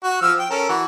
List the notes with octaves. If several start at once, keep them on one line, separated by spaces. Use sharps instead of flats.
F#4
F3 E6 F6
G5
C#4 A4 A#4
E3 F#4